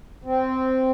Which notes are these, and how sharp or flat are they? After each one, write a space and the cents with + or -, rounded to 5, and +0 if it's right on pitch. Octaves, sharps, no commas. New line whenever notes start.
C4 -10